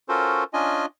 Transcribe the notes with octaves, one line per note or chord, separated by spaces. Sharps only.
C#4 F4 F#4 A4 A#4 C5
C#4 D4 F4 D#5 G#5